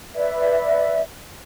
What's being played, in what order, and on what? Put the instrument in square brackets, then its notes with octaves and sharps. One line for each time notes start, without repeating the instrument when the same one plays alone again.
[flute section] B4 D5 E5